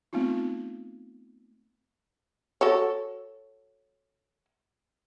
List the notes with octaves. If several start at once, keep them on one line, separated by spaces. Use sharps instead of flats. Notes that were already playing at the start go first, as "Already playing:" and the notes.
A3 B3 C4 D#4 F4
F#4 A4 C#5